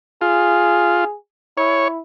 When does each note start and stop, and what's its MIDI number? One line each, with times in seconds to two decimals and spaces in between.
0.22 1.05 65
0.22 1.15 68
1.57 2.00 64
1.57 1.88 73